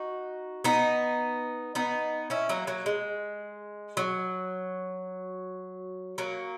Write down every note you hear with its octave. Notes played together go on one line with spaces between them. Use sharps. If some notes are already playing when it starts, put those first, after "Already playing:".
Already playing: D#4 F#4
B3 D#4
B3 D#4
C#4 E4
F#3 A#3
F#3 A#3
G#3
F#3
F#3 A#3